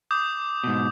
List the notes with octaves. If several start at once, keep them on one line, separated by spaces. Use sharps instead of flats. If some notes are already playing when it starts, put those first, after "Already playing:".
D6 D#6 G6
G#2 B2